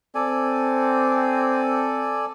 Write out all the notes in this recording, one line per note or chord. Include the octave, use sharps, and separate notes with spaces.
C4 A4 D5 G#5